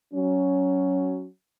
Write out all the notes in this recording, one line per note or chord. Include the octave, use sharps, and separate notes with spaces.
F#3 C#4